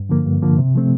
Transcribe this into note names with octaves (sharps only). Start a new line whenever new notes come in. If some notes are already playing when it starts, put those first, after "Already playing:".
Already playing: G2
D3 F3 A#3
G2
D3 F3 A#3
C3
F3 A3 C4